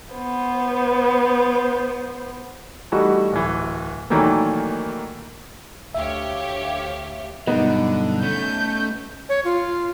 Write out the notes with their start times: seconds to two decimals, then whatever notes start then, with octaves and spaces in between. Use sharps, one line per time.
0.14 B3 C5
2.92 E3 G3 A3 D#4 F#4
3.33 D1 E3
4.10 A#2 D#3 E3 F#3 A3 A#3
5.94 D2 G4 C#5 E5 F5
7.47 G2 B2 D3 F#3 B3 D#4 B4
8.23 A3 C#4 G6
9.29 C#5
9.45 F4